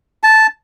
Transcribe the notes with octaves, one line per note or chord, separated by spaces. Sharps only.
A5